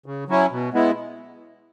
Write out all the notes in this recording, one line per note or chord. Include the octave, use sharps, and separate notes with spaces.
C#3
F#3 C#4 E4
B2
G#3 B3 E4